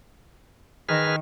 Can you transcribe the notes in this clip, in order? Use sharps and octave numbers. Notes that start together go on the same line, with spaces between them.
D#3 G#4 B4 F6